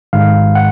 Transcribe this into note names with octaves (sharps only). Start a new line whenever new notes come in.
G#2 D#3 G#3 F5
F#5